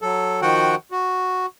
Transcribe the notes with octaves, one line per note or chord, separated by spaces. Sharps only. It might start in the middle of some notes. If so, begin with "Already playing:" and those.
F#3 A4
D#3 F3 F#4 F#5 G5
F#4